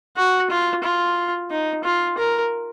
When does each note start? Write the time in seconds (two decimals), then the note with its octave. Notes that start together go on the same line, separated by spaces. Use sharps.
0.17 F#4
0.50 F4
0.83 F4
1.50 D#4
1.84 F4
2.17 A#4